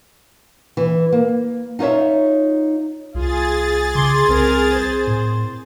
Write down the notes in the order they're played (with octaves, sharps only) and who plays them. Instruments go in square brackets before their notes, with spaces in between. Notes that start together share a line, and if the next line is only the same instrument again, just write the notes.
[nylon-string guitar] E3
A#3
D#4 F4 B4 C#5 E5
[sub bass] C2 [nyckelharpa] F4 [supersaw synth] G#4 A6
[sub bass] C#3 [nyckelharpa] C6 D6
[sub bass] C2 [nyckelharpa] C4 A#4
[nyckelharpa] C5
[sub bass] A2